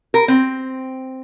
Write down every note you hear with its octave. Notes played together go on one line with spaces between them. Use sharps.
A#4
C4